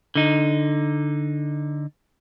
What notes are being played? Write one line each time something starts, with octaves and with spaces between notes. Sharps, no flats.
D3 D#4